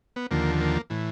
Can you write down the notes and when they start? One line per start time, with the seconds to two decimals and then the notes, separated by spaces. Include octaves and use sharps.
0.16 B3
0.31 D#2 D3 F3 A#3
0.61 A#3
0.90 A2 E3